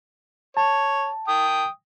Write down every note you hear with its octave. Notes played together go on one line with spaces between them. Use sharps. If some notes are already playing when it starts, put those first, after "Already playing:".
C#5 A5
G5 D#6